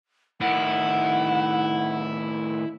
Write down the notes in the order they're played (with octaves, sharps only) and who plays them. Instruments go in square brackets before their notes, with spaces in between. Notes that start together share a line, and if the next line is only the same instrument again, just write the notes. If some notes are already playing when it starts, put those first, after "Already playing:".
[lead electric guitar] A2 D#3 [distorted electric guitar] E4 [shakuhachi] F#5